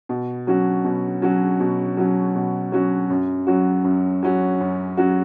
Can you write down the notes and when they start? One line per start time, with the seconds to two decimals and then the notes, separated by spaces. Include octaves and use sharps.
0.09 B2
0.47 F#3 C#4 F#4
0.85 B2
1.22 F#3 C#4 F#4
1.60 B2
1.97 F#3 C#4 F#4
2.35 B2
2.72 F#3 C#4 F#4
3.10 F#2
3.47 F#3 C#4 F#4
3.84 F#2
4.23 F#3 C#4 F#4
4.60 F#2
4.97 F#3 C#4 F#4